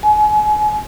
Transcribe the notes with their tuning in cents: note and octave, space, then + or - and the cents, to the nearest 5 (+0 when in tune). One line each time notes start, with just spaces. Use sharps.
G#5 +35